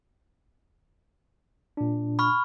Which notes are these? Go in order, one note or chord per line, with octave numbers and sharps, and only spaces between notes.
A#2 D4
B5 C#6 F6